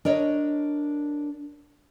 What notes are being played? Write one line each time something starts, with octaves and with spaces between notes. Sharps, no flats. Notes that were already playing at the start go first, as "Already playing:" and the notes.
D4 A#4 C#5 D#5